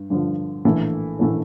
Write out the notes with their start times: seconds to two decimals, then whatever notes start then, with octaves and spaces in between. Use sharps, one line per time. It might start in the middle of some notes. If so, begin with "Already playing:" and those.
Already playing: G2
0.10 G2 D3 F3
0.65 A#1 A2 E3 A3
1.19 A#1 A2 E3 A3